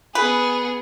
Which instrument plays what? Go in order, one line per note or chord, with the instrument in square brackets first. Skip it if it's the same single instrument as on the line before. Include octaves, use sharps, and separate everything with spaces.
[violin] B3 G#4 [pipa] B4